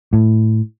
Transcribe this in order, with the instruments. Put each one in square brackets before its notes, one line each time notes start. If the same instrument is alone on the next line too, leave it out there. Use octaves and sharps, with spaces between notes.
[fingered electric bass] A2